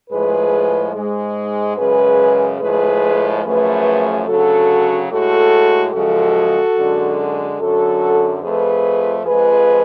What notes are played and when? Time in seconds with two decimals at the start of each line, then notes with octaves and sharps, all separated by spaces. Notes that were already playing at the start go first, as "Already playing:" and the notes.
0.10 A2 F3 G#3 G#4 B4
0.94 G#2 G#3
1.77 F#2 C#3 G#3 G#4 B4
2.60 A2 F3 G#3 G#4 B4
3.43 F#2 F3 A3 G#4 B4
4.26 D2 C#3 F#3 F#4 A4
5.10 A2 G#3 F#4 A4
5.93 F#2 C#3 F3 G#3 F#4 A4
6.77 F#2 D3 G#3
7.59 F#2 D3 F#3 F#4 A4
8.42 F2 F3 A3 G#4 B4
9.26 F2 F3 G#3 G#4 B4